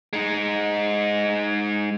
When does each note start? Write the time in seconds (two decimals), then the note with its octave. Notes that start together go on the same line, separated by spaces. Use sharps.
0.13 G#3 D#4